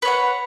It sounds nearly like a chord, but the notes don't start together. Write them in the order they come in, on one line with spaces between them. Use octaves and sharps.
B4 C#5 F#5